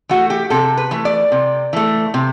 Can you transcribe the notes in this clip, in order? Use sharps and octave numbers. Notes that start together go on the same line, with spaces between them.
E3 A3 F#4
G4
C3 A4
B4
E3 A3
D5
C3
E3 A3
C3